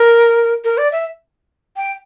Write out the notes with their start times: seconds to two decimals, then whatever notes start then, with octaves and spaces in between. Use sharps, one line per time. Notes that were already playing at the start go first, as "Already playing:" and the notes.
Already playing: A#4
0.64 A#4
0.78 D5
0.92 E5
1.76 G5